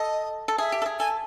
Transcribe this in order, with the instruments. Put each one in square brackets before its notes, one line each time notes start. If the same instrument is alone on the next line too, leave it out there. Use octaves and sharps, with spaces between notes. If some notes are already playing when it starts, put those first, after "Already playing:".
Already playing: [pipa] A4 [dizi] D#5
[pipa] A4
[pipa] G#4 [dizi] E5
[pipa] G4
A4
G#4
[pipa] A4 [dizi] G#5